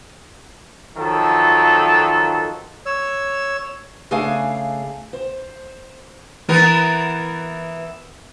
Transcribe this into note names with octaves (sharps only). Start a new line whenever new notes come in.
D#3 F3 F#3 A4
C#5 E6
C#3 A3 D4 G#4 F5 G#5
C5
E3 B3 A#4